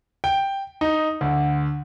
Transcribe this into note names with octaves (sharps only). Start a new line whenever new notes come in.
G5
D#4
D2